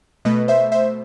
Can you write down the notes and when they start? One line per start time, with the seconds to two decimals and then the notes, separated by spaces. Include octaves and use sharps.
0.25 B2 A3 B4 D#5
0.48 C5 E5
0.72 C5 E5